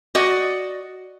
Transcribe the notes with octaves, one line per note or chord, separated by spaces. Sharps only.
F#4 D5 D#5